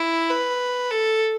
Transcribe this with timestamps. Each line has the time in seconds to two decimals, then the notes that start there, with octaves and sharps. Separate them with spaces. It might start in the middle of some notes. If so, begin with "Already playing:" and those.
Already playing: E4
0.31 B4
0.91 A4